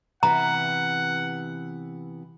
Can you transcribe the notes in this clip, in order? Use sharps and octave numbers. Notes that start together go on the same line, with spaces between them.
C3 E3 B3 F#5 A#5